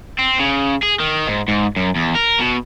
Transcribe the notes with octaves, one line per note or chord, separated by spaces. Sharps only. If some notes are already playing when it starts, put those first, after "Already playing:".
C4
C#3
G#4
D#3
G#2
G#2
F#2
E2
A#4
B2